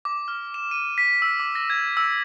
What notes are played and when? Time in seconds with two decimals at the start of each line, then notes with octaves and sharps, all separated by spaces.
0.05 D6
0.28 F6
0.54 E7
0.71 D#7
0.98 B6
1.22 E6
1.39 D6
1.55 A#6
1.70 G#6
1.97 E6